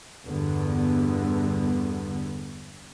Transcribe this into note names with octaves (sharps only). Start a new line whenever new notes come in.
E2 G2 D3 B3